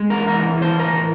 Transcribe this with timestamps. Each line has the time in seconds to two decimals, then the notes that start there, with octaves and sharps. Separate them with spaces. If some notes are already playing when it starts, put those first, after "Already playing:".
Already playing: G#3
0.10 E2 A#4
0.28 A#4
0.33 E3
0.57 E3
0.62 C5
0.79 A2 A#4